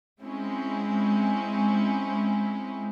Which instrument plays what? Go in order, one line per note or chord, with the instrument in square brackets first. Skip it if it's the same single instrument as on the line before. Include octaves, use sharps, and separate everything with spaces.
[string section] G#3 C4 C#4 E4